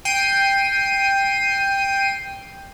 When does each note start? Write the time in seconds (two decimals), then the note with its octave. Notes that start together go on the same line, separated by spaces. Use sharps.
0.05 G5 C7 D#7